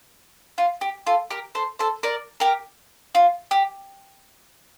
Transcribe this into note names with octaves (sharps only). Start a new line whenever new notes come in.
F4
G4
F4 A4
G4 A#4
A4 C5
A4 C5
A#4 D5
G4 A#4
F4
G4